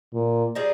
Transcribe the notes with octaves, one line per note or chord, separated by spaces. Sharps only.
A#2
G3 C4 D#4 G#4